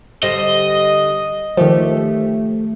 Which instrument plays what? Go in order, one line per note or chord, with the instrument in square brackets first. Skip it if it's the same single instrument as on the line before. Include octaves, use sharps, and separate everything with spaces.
[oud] D3 G3 C4 [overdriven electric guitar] D#5
[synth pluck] D#3 F3 [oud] A3 G4